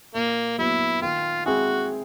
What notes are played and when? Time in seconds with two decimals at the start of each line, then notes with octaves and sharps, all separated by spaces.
0.14 A#2 A#3
0.58 F#3 B3 E4
1.02 D#3 F4
1.46 G#3 C4 E4 F#4 G#4